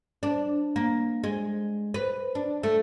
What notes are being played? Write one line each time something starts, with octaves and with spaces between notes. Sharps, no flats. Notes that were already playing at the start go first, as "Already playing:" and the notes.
D4
A#3
G#3
B4
D4
A3